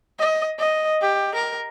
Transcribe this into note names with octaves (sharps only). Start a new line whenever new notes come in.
D#5
D#5
G4
A#4